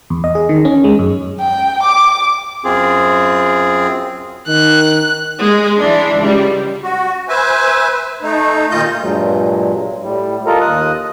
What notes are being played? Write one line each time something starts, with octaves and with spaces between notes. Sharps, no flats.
E2
D#5
G#4
D#3
C#4
G#3
F#2
G5
D6
F#2 C4 F4 G#4
D#3 F#6
G#3
E3 D4
C#2 G3
F#4
B4 C5 E5 G#5
A3 D#4
D#2 A#2 F4 D#5 G6
G2 A#2 F#3 G#3
A2 G3
F4 A4 A#4 D#5 A#5
D#2 D#5 D#6 F#6